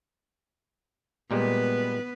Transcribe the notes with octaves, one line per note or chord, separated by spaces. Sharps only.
A#2 G3 G#3 B3 B4